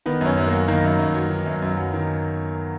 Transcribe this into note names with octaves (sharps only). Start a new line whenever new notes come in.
D#3 B3
F#2 C#4
F#2
A#3
F#3
D#3 A#3
F#2
F#2
F#3
D#3
F#2
F#2
F#3
D#3